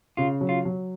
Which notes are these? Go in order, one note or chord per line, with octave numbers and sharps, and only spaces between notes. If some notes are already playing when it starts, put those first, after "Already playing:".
C#3 F4
F#3
F4
F#3